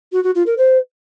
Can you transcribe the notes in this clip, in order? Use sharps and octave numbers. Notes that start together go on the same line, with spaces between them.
F#4
F#4
F4
A#4
C5